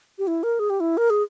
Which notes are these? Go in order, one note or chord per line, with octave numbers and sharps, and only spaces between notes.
G4
E4
A#4
G#4
G4
E4
A#4
G#4